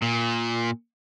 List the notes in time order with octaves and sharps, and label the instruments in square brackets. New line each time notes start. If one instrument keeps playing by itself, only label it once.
[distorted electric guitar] A#2